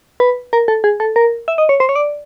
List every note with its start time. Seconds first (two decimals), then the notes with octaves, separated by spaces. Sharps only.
0.20 B4
0.53 A#4
0.68 A4
0.84 G#4
1.00 A4
1.16 A#4
1.48 E5
1.58 D#5
1.69 C#5
1.80 C5
1.89 C#5
1.96 D5